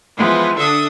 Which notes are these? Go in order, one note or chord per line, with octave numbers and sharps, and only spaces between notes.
E3 F3 G#3 B3
D3 D4 A4 E5 D#6